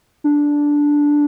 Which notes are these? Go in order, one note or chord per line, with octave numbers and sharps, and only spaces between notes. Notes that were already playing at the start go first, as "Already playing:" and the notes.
D4